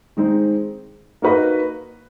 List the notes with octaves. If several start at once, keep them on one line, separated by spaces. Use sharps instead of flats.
D#3 G#3 C4 D#4
A#3 D#4 F#4 B4 D#5